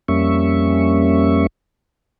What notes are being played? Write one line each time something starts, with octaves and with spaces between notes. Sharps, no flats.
F2 G3 A#3 C#4 E5 C#6